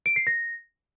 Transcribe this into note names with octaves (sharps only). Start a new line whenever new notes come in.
D7
C7
A#6